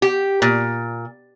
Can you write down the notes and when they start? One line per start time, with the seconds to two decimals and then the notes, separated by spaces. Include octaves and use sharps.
0.02 G4
0.42 A#2